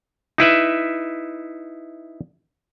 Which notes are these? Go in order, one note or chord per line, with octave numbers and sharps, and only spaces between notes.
D#4 E4 B4 E5